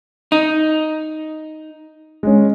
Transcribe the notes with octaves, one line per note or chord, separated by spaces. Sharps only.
D#4
G#3 C#4